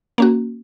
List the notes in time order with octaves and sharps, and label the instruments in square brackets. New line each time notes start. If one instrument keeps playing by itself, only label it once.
[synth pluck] A#3 C#4 F#4